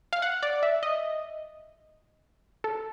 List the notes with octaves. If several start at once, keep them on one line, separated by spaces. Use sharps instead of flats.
F5
F#5
D5
E5
D#5
A4